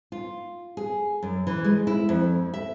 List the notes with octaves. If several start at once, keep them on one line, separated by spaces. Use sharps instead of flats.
F4
G#4
F#2
E3
G#3
E4
F2
E5